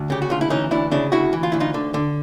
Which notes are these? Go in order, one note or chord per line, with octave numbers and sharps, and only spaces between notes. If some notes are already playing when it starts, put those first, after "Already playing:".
Already playing: D2
C#3 G4
F#4
D2 F4
E4
E3 C#4 D#4
D2 D4 E4
C#3 D4 E4
D2 E4 F#4
E3
F4
D2 E4
D#4 F4
D3
D3